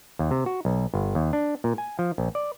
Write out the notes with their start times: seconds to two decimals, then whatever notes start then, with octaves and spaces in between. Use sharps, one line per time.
0.19 D#2
0.31 C3
0.46 F#4
0.65 B1
0.94 G1
1.15 D#2
1.33 D4
1.64 A#2
1.78 G#5
1.99 F3
2.18 A#1
2.35 D5